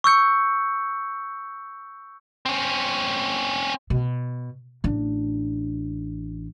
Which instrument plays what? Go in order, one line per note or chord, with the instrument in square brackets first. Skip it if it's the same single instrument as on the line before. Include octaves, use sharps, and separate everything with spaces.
[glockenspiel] C#6 E6 G6 C#7
[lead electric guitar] C4 C#4
[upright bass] B2
A1 D4